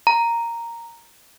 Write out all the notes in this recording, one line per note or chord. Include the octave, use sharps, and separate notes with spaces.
A#5